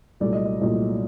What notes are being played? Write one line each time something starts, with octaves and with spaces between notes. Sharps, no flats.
C2 A#2 F#3 A3 D5
D#5
D5
C2 A#2 F#3 A3 D#5